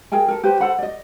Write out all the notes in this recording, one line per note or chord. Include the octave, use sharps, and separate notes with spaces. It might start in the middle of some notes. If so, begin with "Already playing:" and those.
G#4 A#4 G5 G#5
A4 A#4
G4 B4 C5
A4 C5 F#5 B5
D5 D#5